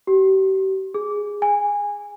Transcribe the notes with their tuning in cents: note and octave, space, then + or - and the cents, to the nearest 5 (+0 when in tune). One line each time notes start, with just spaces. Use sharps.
G4 -40
G#4 -10
G#5 -20